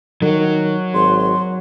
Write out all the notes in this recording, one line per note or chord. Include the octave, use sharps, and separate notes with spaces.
D#3 F#3
G#1 C6